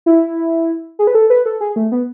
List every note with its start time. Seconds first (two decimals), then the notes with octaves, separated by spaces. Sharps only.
0.06 E4
0.99 G#4
1.07 B4
1.15 A4
1.30 B4
1.46 A4
1.61 G#4
1.76 A3
1.92 B3